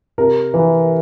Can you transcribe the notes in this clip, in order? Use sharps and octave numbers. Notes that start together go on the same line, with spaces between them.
C3 A#4
E3